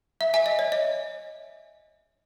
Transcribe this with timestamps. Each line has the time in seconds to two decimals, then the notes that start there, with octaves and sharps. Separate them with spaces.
0.21 E5
0.34 E5 G#5
0.46 D#5
0.59 C#5
0.72 D#5